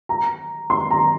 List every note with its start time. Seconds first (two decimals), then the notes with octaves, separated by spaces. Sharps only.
0.09 A#5
0.70 C6
0.91 A#5